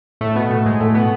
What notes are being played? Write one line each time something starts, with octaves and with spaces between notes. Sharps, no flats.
A2 A3
B2 B3
A2 A3
G#2 G#3
A2 A3
B2 B3